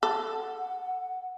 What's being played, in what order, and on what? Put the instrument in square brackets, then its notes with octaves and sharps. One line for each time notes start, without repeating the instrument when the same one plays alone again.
[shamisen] A4 [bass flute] F#5